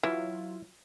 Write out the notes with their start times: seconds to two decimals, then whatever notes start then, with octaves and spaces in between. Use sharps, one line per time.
0.03 E3 F#3 E4 F4